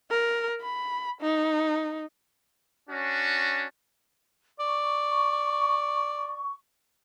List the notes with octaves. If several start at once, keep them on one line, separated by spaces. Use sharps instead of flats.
A#4
B5
D#4
C#4 D4 F#4
D5 C#6